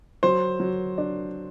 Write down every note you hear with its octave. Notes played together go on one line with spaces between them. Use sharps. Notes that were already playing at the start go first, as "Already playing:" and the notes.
F#3 C5
F#3
D4